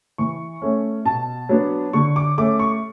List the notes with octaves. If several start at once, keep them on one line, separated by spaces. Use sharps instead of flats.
E3 C#6
A3 C#4
B2 A5
F#3 B3 D4
D3 C#6
D6
A3 C#4 D6
C#6